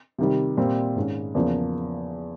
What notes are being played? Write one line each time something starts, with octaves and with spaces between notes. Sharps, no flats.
C3 D#3 G3
A#2 G3 C4
G#2 D#3 G#3 C#4
E2 C#3 F3 A#3